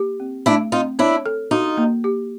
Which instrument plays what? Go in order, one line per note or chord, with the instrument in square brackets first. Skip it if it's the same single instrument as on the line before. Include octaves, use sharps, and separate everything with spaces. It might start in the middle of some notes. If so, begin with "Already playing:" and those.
Already playing: [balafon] A#3 G4
C4
[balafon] A3 [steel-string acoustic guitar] D4 E4
[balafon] C4 [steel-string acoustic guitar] D#4 F4
[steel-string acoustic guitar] D4 E4 [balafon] C#5
[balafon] A4
[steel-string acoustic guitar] D#4 F4 [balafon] F#4
[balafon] A#3
G4